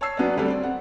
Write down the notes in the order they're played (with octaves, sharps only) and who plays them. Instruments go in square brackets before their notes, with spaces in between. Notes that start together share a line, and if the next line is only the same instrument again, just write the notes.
[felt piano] C#5 A5 E6 C7
F#3 B3 C#4 D4
D2 G3 C4 A4 D5
C4 D5
C4 F#5